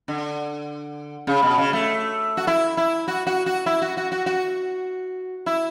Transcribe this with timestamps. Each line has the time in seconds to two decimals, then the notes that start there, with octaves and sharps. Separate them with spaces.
0.08 D3
1.27 C#3
1.43 B2
1.58 C#3
1.73 A3
2.37 F#4
2.47 E4
2.77 E4
3.08 F#4
3.27 F#4
3.46 F#4
3.66 E4
3.82 F#4
3.97 F#4
4.12 F#4
4.26 F#4
5.46 E4